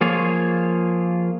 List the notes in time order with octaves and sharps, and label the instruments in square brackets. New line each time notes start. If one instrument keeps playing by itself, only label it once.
[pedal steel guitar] F3 A#3 F4 G#4 C#5